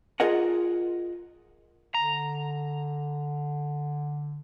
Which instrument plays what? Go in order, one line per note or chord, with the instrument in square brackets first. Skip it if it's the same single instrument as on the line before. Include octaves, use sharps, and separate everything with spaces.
[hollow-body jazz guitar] F4 G#4 A#4 D#5 F#5
[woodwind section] D3 [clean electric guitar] A#5